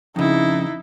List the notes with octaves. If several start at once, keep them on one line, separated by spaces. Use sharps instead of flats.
F2 C#3 D#4 E4